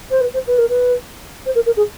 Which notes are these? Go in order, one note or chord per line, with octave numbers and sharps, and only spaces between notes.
C5
B4
C5
B4
A#4
B4
C5
A#4
A#4
G#4